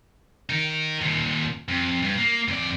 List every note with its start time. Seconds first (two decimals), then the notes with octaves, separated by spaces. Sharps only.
0.50 D#4 A#4
1.01 D#2 A#2
1.68 F2
2.02 G2
2.18 A#3
2.48 F2 D5